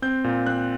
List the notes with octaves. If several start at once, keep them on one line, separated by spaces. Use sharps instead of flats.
C4 G6
A#2
C4 F#6